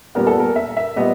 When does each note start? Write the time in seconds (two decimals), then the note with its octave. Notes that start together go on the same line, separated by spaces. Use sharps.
0.15 A#2 G3 B3 A#4
0.27 A4
0.39 A#4
0.56 E5
0.77 E5
0.96 A#2 G3 B3 D#5